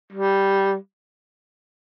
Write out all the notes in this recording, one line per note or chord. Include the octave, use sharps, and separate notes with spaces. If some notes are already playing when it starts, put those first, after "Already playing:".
G3